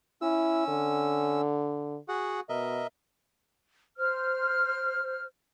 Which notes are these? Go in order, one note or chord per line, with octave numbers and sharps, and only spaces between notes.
C#4 E4 E6
D3
F#4 G#4 F#5
B2 A#4 D#5 E5
C5 F6